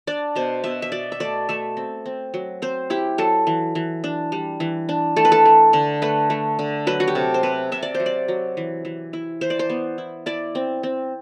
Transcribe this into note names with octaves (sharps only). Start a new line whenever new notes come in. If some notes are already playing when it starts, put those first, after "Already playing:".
D4 D5
B2 C5
B2 E5
E5
B2 D5
E5
A3 D5
A3 E5
C4
C4
F#3
C4 C5
E4 G4
F#3 A4
E3
E3
D4
G3
E3
D4
A3 A4
B4
A4
A3
D3
A3 B4
A3
D3
F#3 B4
F#4
G4
C3 A4
C5
C3 B4
C3 E5
D5
C5
F#3
D5
F#3
E3
E3
E4
E3 C5
D5
C5
B3
E4
E4 D5
C4
C4